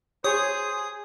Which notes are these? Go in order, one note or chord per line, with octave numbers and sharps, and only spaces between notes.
G#4 C5 C#5 D#6